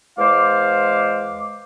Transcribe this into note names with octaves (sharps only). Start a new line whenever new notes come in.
E2 G#3 C5 F5 D6